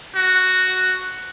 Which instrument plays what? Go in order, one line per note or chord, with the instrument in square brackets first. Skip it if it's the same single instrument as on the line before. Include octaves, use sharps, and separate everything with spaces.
[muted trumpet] F#4